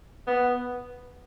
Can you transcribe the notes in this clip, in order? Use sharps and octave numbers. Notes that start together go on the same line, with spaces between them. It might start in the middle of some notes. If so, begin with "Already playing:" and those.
B3